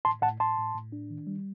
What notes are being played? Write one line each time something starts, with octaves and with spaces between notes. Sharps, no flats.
A2 A5 C6
A2 F#5 A5
A2 A5 C6
A2
A2
D4
D#3
G3